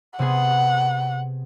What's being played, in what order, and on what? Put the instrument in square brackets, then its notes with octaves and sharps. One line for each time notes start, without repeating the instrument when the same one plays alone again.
[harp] C3 B3 G#4 [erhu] F#5